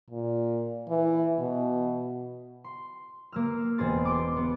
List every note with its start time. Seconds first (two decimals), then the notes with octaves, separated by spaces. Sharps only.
0.10 A#2
0.89 E3
1.39 B2
2.64 C6
3.32 A#3 E6 F6
3.78 E1 B3 C4 G#4 C6 A6
4.05 C6 D6
4.36 B3